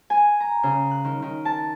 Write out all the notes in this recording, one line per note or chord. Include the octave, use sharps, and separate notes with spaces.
G#5
A#5
C#3
F#6
D#3
D#3
A5